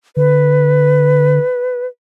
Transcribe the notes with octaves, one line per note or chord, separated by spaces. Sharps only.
D3 B4